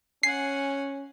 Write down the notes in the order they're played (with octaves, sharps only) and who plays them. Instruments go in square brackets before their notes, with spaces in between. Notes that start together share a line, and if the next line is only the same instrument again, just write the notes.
[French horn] C#4 [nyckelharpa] F#5 G#5 [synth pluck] C7